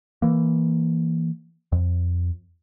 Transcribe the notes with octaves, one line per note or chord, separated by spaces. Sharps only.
E3 A#3
F2